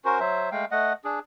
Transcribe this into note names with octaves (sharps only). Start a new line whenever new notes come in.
C#4 F#4 A#4 C5
F#3 C5 E5
G#3 A3 F5 G5
A3 D#5 F#5
D4 G#4